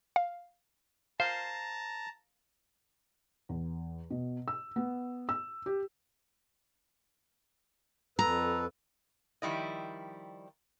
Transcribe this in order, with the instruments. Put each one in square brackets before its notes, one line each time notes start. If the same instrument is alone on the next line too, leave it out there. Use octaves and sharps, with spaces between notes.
[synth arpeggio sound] F5
[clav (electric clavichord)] C5 [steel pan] F5 [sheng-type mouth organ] A5 A#5
[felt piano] E2
B2
E6
B3
E6
G4
[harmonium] F2 A4 B4 [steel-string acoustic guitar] A#5
[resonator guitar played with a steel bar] D#3 F3 G3 E4 D#5